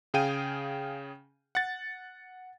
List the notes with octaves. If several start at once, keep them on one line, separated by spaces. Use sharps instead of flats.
C#3 G#4 F5 G5 D#7
F#5 A6